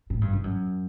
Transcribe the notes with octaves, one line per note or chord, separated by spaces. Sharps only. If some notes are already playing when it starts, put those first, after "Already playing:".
A2
G2
G2
F#2